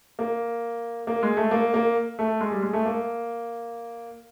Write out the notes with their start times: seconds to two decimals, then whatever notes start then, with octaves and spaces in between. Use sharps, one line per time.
0.19 A#3
1.07 A#3
1.23 G#3
1.37 A3
1.51 A#3
1.74 A#3
2.19 A3
2.41 G#3
2.51 G3
2.62 G#3
2.73 A3
2.86 A#3